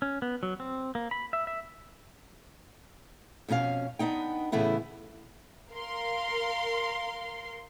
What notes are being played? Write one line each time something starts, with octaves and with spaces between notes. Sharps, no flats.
C#4
B3
F#3
C4
A#3
B5
E5
E5
F2 B2 C#4 G#4 F5
B3 D4 D#4 G5
A2 C#3 E3 A3 B3 E4
A#4 F5 C6